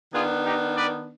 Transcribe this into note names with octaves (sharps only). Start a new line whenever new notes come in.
D#3 B3 D4 F4 G#4
D#4 G4
B4 D5